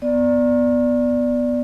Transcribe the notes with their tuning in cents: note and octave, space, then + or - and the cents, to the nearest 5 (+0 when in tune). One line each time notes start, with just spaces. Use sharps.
B3 +0 D5 +0